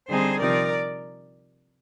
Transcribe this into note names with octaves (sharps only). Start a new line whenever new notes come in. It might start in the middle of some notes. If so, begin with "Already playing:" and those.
D3 G3 C4 D#4 G#4 C5
C3 F3 C4 D#4 A#4 D5